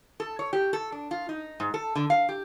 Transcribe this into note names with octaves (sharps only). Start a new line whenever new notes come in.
A4
C#5
G4
A4
D4
F4
D#4
G#2
A4
D3
F5
G4